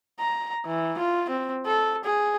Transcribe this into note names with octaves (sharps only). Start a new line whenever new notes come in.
A#5
E3
F4
C4
A4
G#4